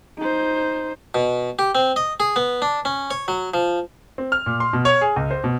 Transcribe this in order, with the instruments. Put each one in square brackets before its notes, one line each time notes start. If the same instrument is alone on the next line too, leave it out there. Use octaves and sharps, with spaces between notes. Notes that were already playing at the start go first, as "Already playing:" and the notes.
[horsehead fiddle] D#4 C5
[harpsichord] B2
G4
C4
D#5
G#4
B3
D4
C#4
C#5
F#3
F3
[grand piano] C4
F6
A#2
C6
B2
C#5
G#4
C#2
C5
B2